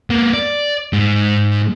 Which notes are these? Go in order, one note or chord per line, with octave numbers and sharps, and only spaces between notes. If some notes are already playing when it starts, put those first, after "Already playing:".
A#3 B3
D5
G#2